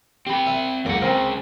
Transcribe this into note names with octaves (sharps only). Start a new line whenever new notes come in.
C4 G4 B5
E5
C#2 F#2 A#3 F#5 D6
C#2 C#3 C4 A#4